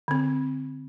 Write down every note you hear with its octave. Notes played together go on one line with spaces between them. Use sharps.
D3 C4